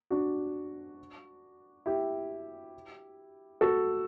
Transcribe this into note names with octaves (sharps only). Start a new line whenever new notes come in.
D4 F#4
E4 G4
F#4 A4